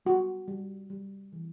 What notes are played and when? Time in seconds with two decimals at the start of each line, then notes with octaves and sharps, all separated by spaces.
0.05 G3 F#4
0.48 G3
0.90 G3
1.33 E3